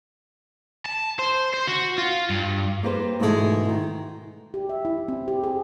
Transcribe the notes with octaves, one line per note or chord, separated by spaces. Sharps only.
A5
C5
C5
F#4
F4
G2
A#3 G4 B4 C5
G#2 B2 E3 F#3 G#3 A3
D#3
G4
E5
E4
C4
G4
G#4